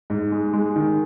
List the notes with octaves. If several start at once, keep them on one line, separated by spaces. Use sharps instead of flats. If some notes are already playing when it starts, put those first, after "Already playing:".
G#2
G#3
G#3
D#3